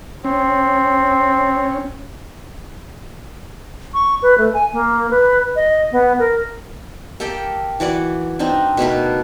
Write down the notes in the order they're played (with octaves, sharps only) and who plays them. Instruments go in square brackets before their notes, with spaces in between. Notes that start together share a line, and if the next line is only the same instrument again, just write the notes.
[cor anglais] C4 [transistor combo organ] C#4
[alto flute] C#6
B4
A3
G#5
A#3
B4
D#5
B3
A#4
[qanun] A#3 G4 A4 G5
E3 F#4 D5 F#5
C4 D4 D#4
B2 A3 A#3 B4